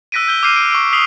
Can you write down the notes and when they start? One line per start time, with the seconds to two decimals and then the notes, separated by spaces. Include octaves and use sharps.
0.12 E6 F#6 A#6 B6 D7 D#7
0.27 E6 G6 G7
0.43 D6 F6 G6 C7 D#7
0.56 D7
0.70 C#6 E6 D7
0.93 D#6 B6 C7 F7 G7